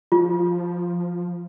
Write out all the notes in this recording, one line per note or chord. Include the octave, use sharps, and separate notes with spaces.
F3 F4